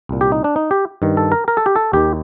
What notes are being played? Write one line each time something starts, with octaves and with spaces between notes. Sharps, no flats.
C2 A#2
G4
D#4
D4
D#4
G4
G2 D#3
A4
A#4
A#4
A4
G4
A4
D#2 D#3 G4